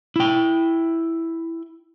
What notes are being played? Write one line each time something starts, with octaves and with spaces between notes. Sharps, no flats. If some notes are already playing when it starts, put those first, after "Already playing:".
E4 G5